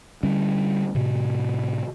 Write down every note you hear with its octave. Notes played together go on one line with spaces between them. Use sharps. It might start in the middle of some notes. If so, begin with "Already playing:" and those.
D3 G3 C#4
A2 C3